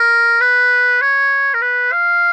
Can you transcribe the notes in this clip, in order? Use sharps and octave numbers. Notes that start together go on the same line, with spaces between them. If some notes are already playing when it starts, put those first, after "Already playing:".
Already playing: A#4
B4
C#5
A#4
B4
F5